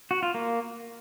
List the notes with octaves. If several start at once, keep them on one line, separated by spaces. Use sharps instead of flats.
F#4
F4
A#3